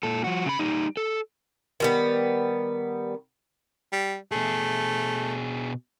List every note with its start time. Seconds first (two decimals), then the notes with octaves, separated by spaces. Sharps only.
0.03 A#2 A4
0.24 F3 F#4
0.45 C#3 B5
0.59 G3 D#4
0.97 A4
1.80 D#3 G3 B3
3.92 G3
4.32 B2 A3 G#4